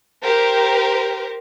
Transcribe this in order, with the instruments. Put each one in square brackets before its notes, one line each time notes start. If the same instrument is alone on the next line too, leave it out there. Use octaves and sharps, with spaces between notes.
[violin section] G4 A#4 C5